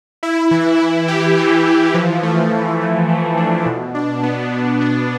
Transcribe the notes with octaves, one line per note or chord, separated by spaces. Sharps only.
E4
E3
E4
G4
E3
E3
F3
A3
F3
A3
A3
D4
B2
D4
B3
B2
D4